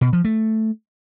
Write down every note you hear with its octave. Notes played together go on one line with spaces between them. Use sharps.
B2
F3
A3